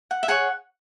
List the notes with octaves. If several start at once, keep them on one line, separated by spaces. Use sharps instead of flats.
F#5
E5
G#4 C#5 F#5